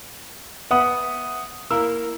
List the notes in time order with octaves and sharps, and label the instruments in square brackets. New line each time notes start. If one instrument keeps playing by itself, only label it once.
[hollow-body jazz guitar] B3 [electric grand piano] E5 F#5 D#6
[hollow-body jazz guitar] A#3 E4 A#4 [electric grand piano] E6